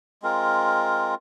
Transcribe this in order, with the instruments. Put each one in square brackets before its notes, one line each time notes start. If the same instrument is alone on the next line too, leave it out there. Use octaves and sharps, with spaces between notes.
[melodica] G#3 C4 F4 A#4